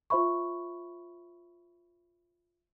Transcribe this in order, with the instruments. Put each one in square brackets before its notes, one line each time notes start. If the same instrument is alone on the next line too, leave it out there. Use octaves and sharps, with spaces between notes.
[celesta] F4 C5 E5 B5 C#6